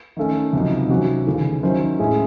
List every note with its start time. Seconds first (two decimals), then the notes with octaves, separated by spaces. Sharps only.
0.17 D#3 A3 C#4
0.53 C#2 C3 F#3 C4 D#4
0.89 C3 D#3 F#3 C#4 F#4
1.26 D#2 C#3 E3 A3
1.63 D#3 F#3 C#4 E4 C5
1.99 A2 G#3 C#4 E4 G#4